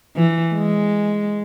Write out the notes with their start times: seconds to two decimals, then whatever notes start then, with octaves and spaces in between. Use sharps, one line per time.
0.16 E3
0.55 G#3